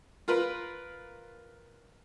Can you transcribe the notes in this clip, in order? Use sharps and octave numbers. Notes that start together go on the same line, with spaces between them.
F4 A#4 B4